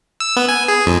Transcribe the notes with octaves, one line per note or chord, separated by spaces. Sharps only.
E6
B3
G#5
G#4
F2